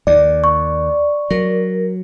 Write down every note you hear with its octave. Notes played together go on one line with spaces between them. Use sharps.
D#2 D5
C#6
F#3 A#4